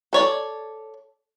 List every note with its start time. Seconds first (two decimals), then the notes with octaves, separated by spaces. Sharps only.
0.13 A4 C#5 D5